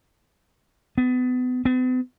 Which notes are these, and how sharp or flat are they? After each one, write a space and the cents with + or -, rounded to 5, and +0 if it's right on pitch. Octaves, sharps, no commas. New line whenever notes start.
B3 +30
B3 +45